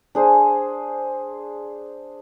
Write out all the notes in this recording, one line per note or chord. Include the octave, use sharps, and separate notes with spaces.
D4 G#4 C5 G#5